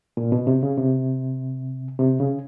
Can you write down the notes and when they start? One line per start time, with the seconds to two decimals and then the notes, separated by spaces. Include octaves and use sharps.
0.17 A#2
0.32 B2
0.47 C3
0.63 C#3
0.78 C3
1.99 C3
2.19 C#3